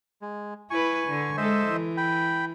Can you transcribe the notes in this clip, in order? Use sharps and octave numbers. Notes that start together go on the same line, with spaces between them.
G#3
E4 B4 G#5 C#6
D3
G#3 A4 C5 D#5 E5
E3
G5 B5